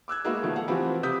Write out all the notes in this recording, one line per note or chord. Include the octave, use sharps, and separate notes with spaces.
D6 E6 F#6 G#6
G#3 A#3 D#4 F#4 B4 E5
B2 D#3 F3 A3 A#3
F5 F#5
E3 F3 C4 F#4 G4 B4
C3 D#6 G6 B6